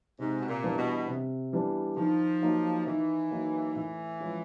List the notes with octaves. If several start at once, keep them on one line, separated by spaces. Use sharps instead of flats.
G#2 C3
B2
A#2
E3 G3 B3 D4
B2
C3
E3 G3 B3 D4
D#3 F3
F#3 A#3 D#4
D#3 E3
F#3 A#3 D#4
A2 E3
F3 G#3 C#4 F4